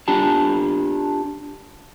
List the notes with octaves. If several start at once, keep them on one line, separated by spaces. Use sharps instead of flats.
D4 F4 G4 A5